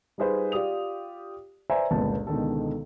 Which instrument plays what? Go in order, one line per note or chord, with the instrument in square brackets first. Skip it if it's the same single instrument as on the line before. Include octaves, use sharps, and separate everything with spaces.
[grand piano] G3 D#4 F4 G#4 B4 C5
F4 G4 D5 D#6 F7
B4 C5 D5 E5 G#5 A#5
G1 C#2 A#2 B3 A5
C#2 B2 D3 D#3 A4